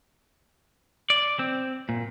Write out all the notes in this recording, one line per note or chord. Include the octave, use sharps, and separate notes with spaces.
D5
C4
A#2